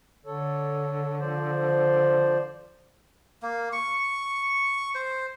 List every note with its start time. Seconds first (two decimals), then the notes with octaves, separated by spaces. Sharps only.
0.26 D3 A4 C#5
1.20 F3 C5 D5
3.43 A#3
3.73 C#6
4.95 C5